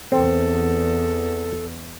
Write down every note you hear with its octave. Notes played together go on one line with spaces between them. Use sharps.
E2 C4 A4